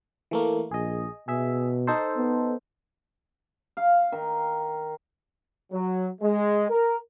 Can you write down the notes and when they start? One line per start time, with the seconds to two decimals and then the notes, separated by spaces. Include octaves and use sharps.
0.31 E3 A3 A#3
0.71 A#1 G#4 D#5
1.28 B2 G#4 E5
1.87 D#4 A4 C5
2.16 B3
3.77 F5
4.12 D#3
5.72 F#3
6.22 G#3
6.69 A#4